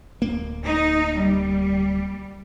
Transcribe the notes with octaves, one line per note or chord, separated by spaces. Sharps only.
D1 F2 A#3
D#4
G3